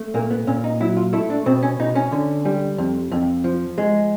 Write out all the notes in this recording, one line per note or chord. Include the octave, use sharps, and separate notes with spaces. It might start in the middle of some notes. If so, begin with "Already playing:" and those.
Already playing: A3
A#2 A#3
B3
A#2 C#4
D#4
F#3 E4
F4
A3 E4
D4
B2 C4
C#4
B2 D#4
C#4
D3
G3
F2
F2
F3
G#3